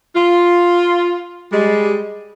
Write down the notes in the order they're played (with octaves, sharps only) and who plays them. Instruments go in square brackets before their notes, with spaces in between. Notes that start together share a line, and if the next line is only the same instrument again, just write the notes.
[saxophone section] F4
G3 G#3